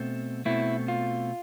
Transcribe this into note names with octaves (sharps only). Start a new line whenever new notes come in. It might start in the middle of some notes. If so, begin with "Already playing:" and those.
Already playing: B2 A3 C4
B2 A3 C4 E4
F4